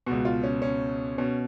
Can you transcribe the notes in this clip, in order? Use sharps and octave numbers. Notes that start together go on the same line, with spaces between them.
C#2 B2 F#4
F4
C#4
C#4
B2 C#4